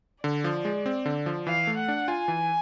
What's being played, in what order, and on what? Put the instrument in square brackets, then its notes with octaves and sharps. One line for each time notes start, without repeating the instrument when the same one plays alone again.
[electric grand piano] D3 [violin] D5
[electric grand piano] F3
G#3
C4
D3
F3
[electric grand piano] E3 [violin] F5
[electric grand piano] A3
[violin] F#5
[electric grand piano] D4
[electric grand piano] F4 [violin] G#5
[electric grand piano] E3